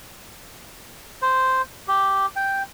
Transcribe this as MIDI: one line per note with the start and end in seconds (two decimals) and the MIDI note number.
1.22 1.62 72
1.88 2.26 67
2.36 2.63 79